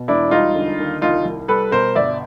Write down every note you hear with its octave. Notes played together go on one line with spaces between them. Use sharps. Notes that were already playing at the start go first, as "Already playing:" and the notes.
Already playing: B2
E1 D4 E4
G3 D#4 F4
D3
D#2
C2 D#4 F4
C2
G3 A4 B4
B2 A#4 C5
G1 D5 E5